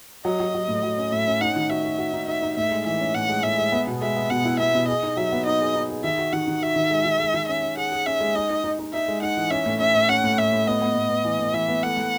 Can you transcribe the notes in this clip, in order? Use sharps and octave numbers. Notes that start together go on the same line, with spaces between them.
F#3 D#5
F#3
F#3
A2
F#3
C#4
A2 E5
C#4
D#4 F#5
D#3
F#4 E5
F#4
F#4
D#4
D#4 E5
D#4
A2 E5
G#3
E3 E5
C#4
A2 F#5
G#3
A2 E5
G#3
B3
B2
G#3 E5
B3
B2 F#5
E4
B3 E5
B2
G#4 D#5
D#4
F#3 E5
B3
D#4 D#5
G#4
D#4
G#4
D#3 E5
F#4
D#3 F#5
D#3
F#4 E5
D#3
G#3
D#3
G#3
D#3
C#4 E5
C#4
G#4 F#5
G#4
C#4 E5
G#3
D#4 D#5
D#4
D#4
D#4
D#4 E5
G#3
D#4 F#5
E3
C#4 E5
A2
C#4 E5
A2
C#4 F#5
A2
A2 E5
A2
B3 D#5
B3
A2
B3
E3
A2
E3 E5
B3
A3 F#5
A3